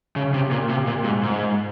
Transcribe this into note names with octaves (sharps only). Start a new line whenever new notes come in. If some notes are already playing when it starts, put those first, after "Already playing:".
C#3
C3
A#2
C3
A#2
G#2
G#2